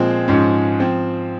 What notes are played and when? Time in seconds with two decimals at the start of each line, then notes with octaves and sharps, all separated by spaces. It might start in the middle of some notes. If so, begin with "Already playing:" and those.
Already playing: A#2 F3 G#3 C4
0.28 G#2 F3 G#3 C#4
0.80 F3 C4